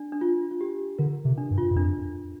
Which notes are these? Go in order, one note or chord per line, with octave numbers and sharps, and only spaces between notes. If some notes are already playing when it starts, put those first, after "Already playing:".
Already playing: D4
D4
F4
F4
G4
D3 A#4
C3
D4
G2
F4
G2
F2 D4